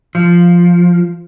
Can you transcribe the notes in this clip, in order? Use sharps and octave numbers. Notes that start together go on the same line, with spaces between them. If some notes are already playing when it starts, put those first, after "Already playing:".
F3